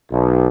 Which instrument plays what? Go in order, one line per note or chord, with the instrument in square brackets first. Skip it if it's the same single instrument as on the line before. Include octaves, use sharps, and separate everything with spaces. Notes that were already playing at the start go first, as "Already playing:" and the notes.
[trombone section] B1